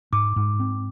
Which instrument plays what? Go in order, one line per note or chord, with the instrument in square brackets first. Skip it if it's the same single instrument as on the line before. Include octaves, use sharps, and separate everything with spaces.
[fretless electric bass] G#2 [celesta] D6
[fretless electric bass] G#2
C4